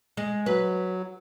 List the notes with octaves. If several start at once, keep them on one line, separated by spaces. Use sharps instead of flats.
G#3
F#3 B4